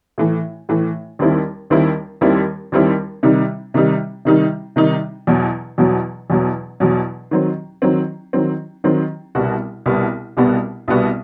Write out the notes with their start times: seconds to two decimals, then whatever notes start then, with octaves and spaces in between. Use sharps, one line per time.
0.18 A2 E3 A3
0.69 A2 E3 A3
1.19 D#2 D#3 G3 C4 E4
1.70 D#2 D#3 G3 C4 E4
2.21 D#2 D#3 G3 C4 E4
2.72 D#2 D#3 G3 C4 E4
3.23 C3 D#3 G3 D#4
3.74 C3 D#3 G3 D#4
4.25 C3 D#3 G3 D#4
4.76 C3 D#3 G3 D#4
5.27 E2 B2 F#3
5.78 E2 B2 F#3
6.30 E2 B2 F#3
6.80 E2 B2 F#3
7.31 D#3 F#3 C4
7.82 D#3 F#3 C4
8.33 D#3 F#3 C4
8.84 D#3 F#3 C4
9.35 C2 B2 G3 B3 F#4
9.86 C2 B2 G3 B3 F#4
10.37 C2 B2 G3 B3 F#4
10.88 C2 B2 G3 B3 F#4